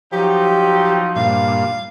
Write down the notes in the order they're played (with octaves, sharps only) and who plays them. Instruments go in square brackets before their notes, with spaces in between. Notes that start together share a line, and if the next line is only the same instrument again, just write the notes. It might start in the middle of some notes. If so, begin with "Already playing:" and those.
[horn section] F3 F#3 D#4 [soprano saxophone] G4
[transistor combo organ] G2 A#2 [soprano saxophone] F5